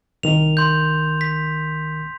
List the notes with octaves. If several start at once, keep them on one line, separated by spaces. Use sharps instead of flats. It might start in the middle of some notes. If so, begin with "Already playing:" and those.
C2 D#3 A#4 F7
C6 G6
B6